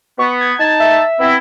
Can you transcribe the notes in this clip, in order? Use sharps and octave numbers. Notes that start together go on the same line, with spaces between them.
B3 C#6
G#6
D#4 A5
E5
B3 C4 E4